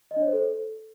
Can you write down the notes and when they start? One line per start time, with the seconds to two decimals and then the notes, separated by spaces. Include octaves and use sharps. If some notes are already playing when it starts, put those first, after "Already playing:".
0.11 D#5
0.16 D4
0.22 C#5
0.27 C5
0.33 A4